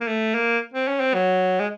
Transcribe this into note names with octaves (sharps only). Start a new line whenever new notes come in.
A#3
A3
A#3
C4
C#4
C4
F#3
G#3